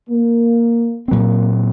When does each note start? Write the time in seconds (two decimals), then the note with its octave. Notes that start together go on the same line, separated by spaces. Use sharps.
0.10 A#3
1.08 A#2 F#3 A#3 C4